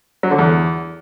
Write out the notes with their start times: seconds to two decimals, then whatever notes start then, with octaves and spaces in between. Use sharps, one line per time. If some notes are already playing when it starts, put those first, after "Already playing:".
0.23 F#3
0.31 D3
0.39 E2